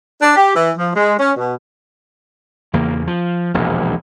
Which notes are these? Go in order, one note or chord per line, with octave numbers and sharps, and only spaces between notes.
D4
G4
E3
F3
G#3
C#4
B2
E2 C#3 A#3
F3
E1 A#1 D#2